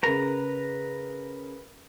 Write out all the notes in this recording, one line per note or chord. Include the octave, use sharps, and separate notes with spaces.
C#3 A#4 B4 A#5